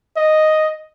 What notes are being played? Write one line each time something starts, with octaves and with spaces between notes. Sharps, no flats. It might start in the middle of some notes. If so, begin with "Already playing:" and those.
D#5